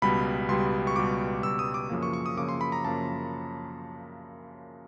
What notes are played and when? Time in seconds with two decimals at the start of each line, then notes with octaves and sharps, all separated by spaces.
0.02 C#2 B2 G3 B5
0.48 C#2 B2 G3 C6
0.87 C#6
0.96 C#2 B2 G3 D6
1.43 C#2 B2 G3 E6
1.59 D#6
1.74 D6
1.90 F#2 C#3 F3 A#3
2.03 C#6
2.13 C#6
2.26 D#6
2.37 F#2 C#3 F3 A#3 D6
2.49 C6
2.61 B5
2.72 A#5
2.85 F#2 C#3 F3 A#3 A5